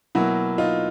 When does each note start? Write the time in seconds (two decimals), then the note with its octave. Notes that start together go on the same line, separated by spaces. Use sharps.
0.15 B2 F#3 A#3 E4 F#4
0.58 D#4 F4